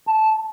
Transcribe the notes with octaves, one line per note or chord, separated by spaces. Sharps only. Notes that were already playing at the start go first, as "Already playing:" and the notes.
A5